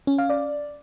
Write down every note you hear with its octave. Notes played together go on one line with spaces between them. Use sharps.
C#4
F5
D5